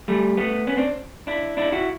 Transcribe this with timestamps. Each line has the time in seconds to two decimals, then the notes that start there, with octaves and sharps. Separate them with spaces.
0.08 G3 A3
0.37 A3 B3
0.67 B3 C#4
0.77 C4 D4
1.27 D4 E4
1.57 D4 E4
1.72 E4 F#4